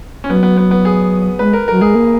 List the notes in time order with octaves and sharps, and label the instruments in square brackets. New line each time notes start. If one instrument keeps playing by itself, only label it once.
[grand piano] C#4
[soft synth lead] F#3 [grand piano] B3
[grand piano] B3
B3
B3
G#4
[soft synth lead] G#3 [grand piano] B4
[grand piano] A#4
[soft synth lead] F#3 [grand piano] A#4
[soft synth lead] G#3 [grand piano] G#4
[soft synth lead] A#3